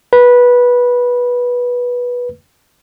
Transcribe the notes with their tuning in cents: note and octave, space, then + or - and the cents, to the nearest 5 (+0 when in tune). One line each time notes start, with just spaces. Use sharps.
B4 -15